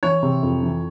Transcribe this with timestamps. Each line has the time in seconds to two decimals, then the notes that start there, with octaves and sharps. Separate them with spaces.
0.03 E3 C#5
0.23 C3
0.43 F2
0.63 E3